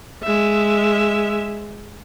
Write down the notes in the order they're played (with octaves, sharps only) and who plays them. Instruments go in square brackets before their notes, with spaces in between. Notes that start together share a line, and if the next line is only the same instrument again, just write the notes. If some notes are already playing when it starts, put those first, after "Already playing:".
[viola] G#3 E5